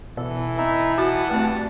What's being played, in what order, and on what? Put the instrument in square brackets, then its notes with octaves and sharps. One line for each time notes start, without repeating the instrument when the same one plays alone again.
[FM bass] B2 [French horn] E3 [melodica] A4
[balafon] C4 [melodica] D#4 E4 E5
[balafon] F#4 [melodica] F#5 A5
[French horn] G2 [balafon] A3 C4